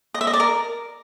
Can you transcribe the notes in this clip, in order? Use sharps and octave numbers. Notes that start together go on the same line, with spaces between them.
D#5
E5
D#5
D5
A#4